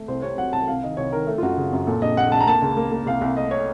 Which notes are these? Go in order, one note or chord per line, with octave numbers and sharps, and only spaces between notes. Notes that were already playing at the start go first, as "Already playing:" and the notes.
Already playing: A3
C2 C5
C3 C#5
F#3 F#5
C2 A5
C2 F5
D#3 D#5
C2 C#5
D#3 A#4
A3 A4
F4
F#2 F#4
C#3
F#2
A#2 A4
A#1 D#5
A#1 F#5
A#1 A5
A#5
A#3 A5
C#2
A#3
A#3
C2 F5
C2
A3 D#5
C#5